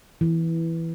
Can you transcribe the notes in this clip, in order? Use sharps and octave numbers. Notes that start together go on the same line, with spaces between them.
E3